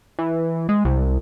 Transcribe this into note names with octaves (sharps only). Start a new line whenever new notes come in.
E3
G#3
C2